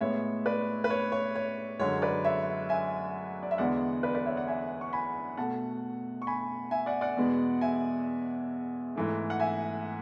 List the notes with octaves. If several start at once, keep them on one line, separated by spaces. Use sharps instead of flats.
A2 G#3 B3 C#5 E5
B4 D5
B4
C#5
C#5
C#5
F#2 D3 G#3 C#5
B4 D5
C#5 E5
E5 G#5
D5
E5
E2 D3 G#3 B3 D5 F#5
B4 D5
B4 D5
C#5 E5
D5 F#5
E5 G#5
C#6
G#5 B5
B2 A3 F#5 A5
C#6
G#5 B5
E5 G#5
D5 F#5
D5 F#5
E2 B2 G#3 B3
E5 G#5
G#2 E3 A3
F#5
E5 G#5